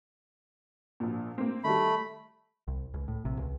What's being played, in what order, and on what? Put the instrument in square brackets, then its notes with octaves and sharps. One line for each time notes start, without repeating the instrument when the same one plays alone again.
[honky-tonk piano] A#1 A#2
A#3 C4
[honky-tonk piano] D#3 G3 [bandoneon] A3 B5
[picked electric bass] C2
C#2
A2
A#1 C3
C#2